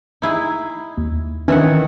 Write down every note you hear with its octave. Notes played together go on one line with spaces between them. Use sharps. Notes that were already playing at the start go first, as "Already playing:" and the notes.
D#4 E4 G#4
D#2
D#3 E3 C#4 D4 E5 F#5